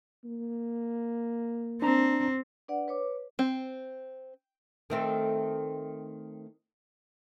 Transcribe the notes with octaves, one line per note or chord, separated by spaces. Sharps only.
A#3
C4 D4 A#5
D4 B4 D5 F#5
B4 C#5 D6
C4
D#3 A3 C4